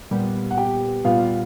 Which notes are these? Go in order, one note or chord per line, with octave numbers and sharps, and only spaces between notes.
A#2 G3 B3
F#5
G4 G5
A#2 G3 B3 F4 F5